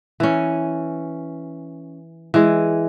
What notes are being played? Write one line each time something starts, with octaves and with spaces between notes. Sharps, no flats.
E3 C#4
E3 G#3